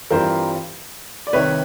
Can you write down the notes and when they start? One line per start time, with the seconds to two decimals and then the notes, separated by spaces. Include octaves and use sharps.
0.10 G2 E3 G3 C4 F4 A#4 C5
1.27 D5
1.33 C2 C3 D#3 B4 C#5